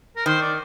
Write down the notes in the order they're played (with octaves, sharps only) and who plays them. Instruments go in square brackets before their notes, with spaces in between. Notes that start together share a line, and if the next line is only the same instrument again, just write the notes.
[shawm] A#4
[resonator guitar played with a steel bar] D#3 [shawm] C5
[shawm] D5